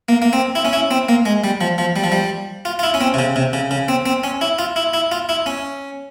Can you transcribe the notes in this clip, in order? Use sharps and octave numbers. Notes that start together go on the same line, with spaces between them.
A#3
A#3
C4
E4
C#4
E4
C4
A#3
G#3
G3
F3
F3
G3
F3
G3
F4
F4
E4
C#4
C4
C3
C#3
C3
C#3
C#3
C4
C4
C#4
E4
F4
E4
E4
F4
E4
C#4